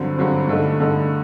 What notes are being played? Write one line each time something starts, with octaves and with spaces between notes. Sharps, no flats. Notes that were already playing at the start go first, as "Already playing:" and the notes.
Already playing: G2 D3 F#3 C4
G2 D3 F#3 C4
G2 D3 A3 D#4
G2 D3 A3 D#4